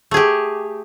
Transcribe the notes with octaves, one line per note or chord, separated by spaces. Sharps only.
A3 G4 G#4